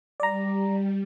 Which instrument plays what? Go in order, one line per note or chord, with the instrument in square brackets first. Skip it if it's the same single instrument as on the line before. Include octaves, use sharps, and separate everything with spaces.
[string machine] G3 [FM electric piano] D5 A#5